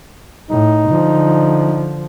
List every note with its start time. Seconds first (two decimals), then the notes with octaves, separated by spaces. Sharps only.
0.51 A2 D#4
0.89 D3 F3